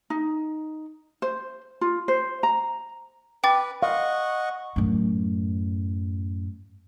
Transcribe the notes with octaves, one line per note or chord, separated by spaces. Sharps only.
D#4
C5
F4
C5
A#5
B4 G5 D6 A6
D#5 F5 F#5 C#6
F#2 A2